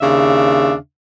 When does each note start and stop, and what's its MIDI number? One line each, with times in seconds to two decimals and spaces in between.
0.01 0.72 39
0.01 0.72 49
0.01 0.72 62
0.01 0.72 76
0.01 0.72 77